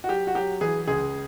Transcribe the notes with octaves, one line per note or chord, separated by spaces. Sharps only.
F#4
F#3 G4
F#4
F#3 G4
E3 G#4
C#2 G#4